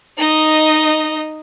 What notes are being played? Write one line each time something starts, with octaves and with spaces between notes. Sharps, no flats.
D#4 D#5